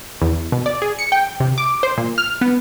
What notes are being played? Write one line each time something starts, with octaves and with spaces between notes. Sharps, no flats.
E2
B2
D5
G#4
C#7
G5
C3
D6
C5
A#2
F6
B3